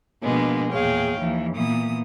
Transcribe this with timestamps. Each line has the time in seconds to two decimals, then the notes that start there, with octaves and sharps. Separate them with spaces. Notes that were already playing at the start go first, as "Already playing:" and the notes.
0.23 B2 F3 G#3 A#3 B3 D4
0.71 E2 A#2 G#4 C#5 F5 G5
1.19 D#2 E3 F3
1.54 A#2 E3 B3 D#6